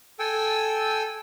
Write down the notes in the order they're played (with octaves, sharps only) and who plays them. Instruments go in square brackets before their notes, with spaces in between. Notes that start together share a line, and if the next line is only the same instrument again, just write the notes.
[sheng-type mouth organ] A4 G5 G#5 E6